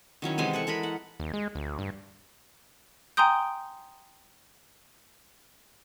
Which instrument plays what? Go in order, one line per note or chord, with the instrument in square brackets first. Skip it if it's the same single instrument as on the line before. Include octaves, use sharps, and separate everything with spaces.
[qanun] D#3 F#3 C#4 E4
C3 E3 G#3 G#5
A4 F#5 C#6
G#3 A4 A#4 B5
F#5
[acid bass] D#2
G#3
D2
G2
[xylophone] G5 G#5 A#5 C6 D#6 G6